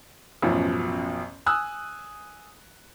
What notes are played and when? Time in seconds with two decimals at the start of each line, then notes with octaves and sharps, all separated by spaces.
0.42 A1 F#2 B2 F3
1.46 G#5 D#6 E6 F#6